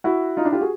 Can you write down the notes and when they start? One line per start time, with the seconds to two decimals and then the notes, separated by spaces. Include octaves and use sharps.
0.04 E4 F#4
0.37 D#4 F4
0.45 D4 E4
0.52 F4 G4
0.61 F#4 G#4